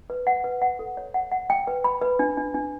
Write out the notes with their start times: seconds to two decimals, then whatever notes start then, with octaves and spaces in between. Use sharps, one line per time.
0.10 B4
0.27 F#5
0.44 B4
0.62 F#5
0.79 A4
0.97 C#5
1.14 F#5
1.32 F#5
1.50 G5
1.67 B4
1.84 B5
2.02 B4
2.19 D4
2.37 D4
2.54 D4